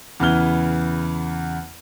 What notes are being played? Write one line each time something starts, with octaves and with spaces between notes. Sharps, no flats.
E2 C#3 E3 B3 F6 G7